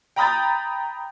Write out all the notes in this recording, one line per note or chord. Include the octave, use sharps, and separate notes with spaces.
G5 A#5 B5 D#6 G6 A6